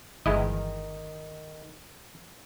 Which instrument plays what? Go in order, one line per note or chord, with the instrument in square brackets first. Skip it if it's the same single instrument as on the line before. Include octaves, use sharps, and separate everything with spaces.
[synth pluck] G1 E3 [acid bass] D#3 [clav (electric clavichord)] G#3 E4 D#5